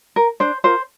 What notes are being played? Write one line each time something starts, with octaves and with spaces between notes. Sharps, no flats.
A#4
D4 C5
F4 A#4 C5